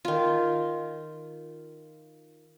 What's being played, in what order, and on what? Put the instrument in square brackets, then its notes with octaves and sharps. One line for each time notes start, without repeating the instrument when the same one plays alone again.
[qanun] D#3 F4